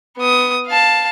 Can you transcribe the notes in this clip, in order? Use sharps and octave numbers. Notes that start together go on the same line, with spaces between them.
B3 D#6
F5 A5